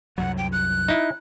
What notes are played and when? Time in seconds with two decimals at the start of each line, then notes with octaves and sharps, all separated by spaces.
0.18 C2 F#2 F#3 F#5
0.38 G5
0.52 F#6
0.88 D#4 E4